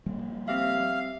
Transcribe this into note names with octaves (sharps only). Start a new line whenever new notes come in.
F3 G3 A#3
C4 G4 E5 F5